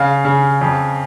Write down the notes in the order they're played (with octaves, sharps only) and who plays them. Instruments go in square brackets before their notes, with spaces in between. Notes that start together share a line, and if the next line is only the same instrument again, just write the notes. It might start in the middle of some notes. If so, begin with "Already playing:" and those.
Already playing: [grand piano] C#3 F5
C#3
F2